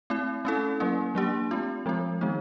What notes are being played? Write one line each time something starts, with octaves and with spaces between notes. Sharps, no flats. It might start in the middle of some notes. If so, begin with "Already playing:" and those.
A3 C4 E4
A3 C#4 E4 A4
F#3 A#3 C#4
F#3 A#3 D4 G4
A3 C4 F4
F3 G#3 C4 F4
D#3 G#3 B3 D#4